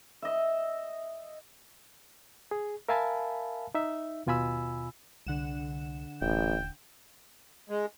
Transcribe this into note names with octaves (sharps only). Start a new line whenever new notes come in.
D#5 E5
G#4
A#4 E5 F5 G#5 A5 B5
D#4 E5
D#2 B2 F4 G#5 B5 E6
C2 D3 F#5 E7
D#1 A1 G5
G#3